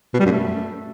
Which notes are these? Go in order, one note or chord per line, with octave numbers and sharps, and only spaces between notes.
B2
G3
F#2
A3